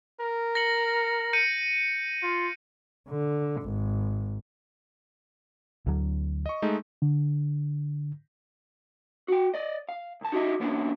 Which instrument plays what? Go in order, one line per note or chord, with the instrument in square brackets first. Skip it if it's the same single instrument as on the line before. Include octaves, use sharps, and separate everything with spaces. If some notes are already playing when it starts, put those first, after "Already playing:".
[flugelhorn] A#4
[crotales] A#6 C#7 F#7
G6 C#7 D#7
[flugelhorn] F4
[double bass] D3
G#1
[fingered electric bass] D2 D3 F#3
[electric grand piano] D#5 C#6
G#3 A3 D#4
[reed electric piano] D3
[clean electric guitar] F#4 G5
D5 D#5
F5
C2 A5
D#4 F#4 G4 D#5 E5
E3 A#3 B3 C#4 D4 E4